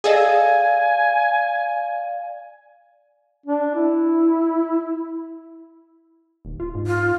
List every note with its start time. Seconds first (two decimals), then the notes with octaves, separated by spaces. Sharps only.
0.04 G#4 A4 D5 D#5 F5 G#5
3.46 D4
3.75 E4
6.45 D#1
6.60 F4
6.74 G#2
6.87 F4